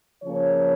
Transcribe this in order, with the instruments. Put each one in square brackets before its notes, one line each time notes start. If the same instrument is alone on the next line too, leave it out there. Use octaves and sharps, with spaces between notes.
[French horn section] C#3 F3 A#3 C#4 C#5